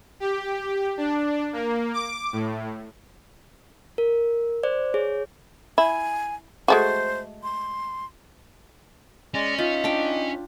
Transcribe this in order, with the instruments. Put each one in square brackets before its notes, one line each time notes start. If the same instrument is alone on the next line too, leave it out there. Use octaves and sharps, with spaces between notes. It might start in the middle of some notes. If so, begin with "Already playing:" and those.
[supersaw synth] G4
D4
A#3
D6
A2
[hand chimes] A#4
C5 D5
G#4 C#5
[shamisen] E4 [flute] G#5
[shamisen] G#3 A3 F#4 [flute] C5
[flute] C6
[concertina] G#3 D5 D#5 [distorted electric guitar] C#4
[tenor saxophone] D#4 [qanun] F4 [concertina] E5
[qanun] D4 G5